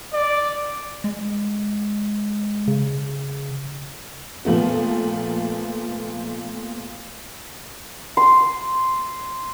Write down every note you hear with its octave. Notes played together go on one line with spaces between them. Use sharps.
D5
G#3
C#3
A#2 F3 A3 B3
C6